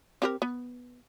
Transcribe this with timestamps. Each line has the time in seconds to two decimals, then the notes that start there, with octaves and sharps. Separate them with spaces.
0.22 C4 G4 A#4
0.42 B3